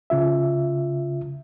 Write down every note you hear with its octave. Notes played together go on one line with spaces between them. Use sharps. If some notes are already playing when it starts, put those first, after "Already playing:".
C#3 F4 E5